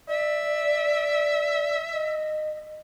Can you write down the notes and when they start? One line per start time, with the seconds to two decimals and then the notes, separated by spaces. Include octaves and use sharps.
0.09 D5 E5
1.93 D#5